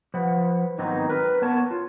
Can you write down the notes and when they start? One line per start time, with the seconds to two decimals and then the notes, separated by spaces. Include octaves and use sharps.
0.14 F3 B4 F#5
0.78 G#2 D#3 F#3 B3 C4 D#4
1.10 A#4 B4
1.42 B3 C#5 A5
1.71 F4